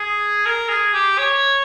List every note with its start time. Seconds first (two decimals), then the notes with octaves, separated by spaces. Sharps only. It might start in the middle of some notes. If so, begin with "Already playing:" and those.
Already playing: G#4
0.46 A#4
0.69 G#4
0.93 G4
1.18 C#5